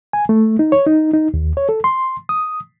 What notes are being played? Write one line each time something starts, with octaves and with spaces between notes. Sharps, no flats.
G#5
A3
D#4
C#5
D#4
D#4
D#2
C#5
A4
C6
D#6